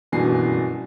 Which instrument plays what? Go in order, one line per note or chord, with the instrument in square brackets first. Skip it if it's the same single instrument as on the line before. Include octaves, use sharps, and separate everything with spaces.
[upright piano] F#1 G2 B2 E3 G#5 C7